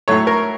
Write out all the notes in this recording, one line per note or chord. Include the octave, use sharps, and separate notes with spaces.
A2 F#3 A3 C#5
A#4